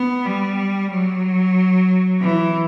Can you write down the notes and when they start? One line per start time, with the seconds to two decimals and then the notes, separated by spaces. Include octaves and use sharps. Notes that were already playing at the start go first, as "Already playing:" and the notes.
Already playing: B3
0.26 G3
0.92 F#3
2.21 E3